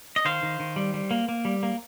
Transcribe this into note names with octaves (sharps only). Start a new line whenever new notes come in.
D#5
D#3 C5 F5
D#3
D#3
G3
G3
A#3
A#3
G3
A#3